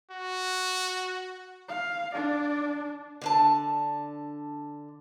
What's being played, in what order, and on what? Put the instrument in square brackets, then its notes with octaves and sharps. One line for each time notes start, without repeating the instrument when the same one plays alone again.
[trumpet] F#4
[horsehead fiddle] F5
D4 D5
[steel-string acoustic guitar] D3 D4 A5